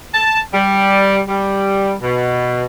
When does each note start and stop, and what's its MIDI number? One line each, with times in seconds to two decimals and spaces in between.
0.14 0.40 81
0.54 1.21 55
1.28 1.94 55
2.01 2.66 47